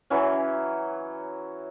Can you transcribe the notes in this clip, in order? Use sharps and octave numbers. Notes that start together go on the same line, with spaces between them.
E3 F#3 C#4